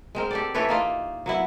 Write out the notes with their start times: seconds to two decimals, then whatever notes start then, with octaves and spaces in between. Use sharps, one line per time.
0.15 G#3 C4 A#4
0.31 G4 A4 D5
0.54 E3 A4 B4 C#5
0.69 A#3 D#4 F4
1.26 F#3 B3 E4